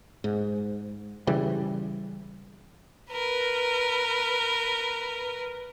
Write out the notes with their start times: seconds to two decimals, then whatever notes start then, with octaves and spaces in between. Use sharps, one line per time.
0.24 G#2
1.27 C#3 E3 G3
3.10 A#4 B4